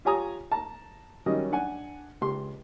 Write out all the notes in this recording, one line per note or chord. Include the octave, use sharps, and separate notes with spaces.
F4 G4 C#5 G#5 A#5 D#6
A5 A#5
D#3 F#3 G3 C#4 D#5
D4 F#5 G#5
C#2 G4 C6